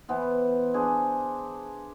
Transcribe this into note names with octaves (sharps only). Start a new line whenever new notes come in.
E3 B3 C5
D4 G#4 C5